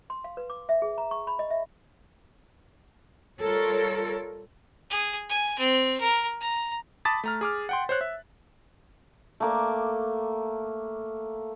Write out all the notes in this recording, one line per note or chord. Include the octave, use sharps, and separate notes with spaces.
C6
F5
B4
D6
E5
G#4
A#5
C#6
B5
D#5
E5
G3 F4 A4 A#4 C#5
G#4
G#5
C4
A#4
A#5
A5 B5 D6 D#6 A6 B6
A3 A#5 F6
G#4 D6 F6
F#5 G5 C6
C5 C#5 F#6
E5
A3 A#3 D6